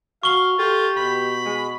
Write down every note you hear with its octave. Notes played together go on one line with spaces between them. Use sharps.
F#4 F5 C#6 G7
F4 G4 A4
B2 B5
G#3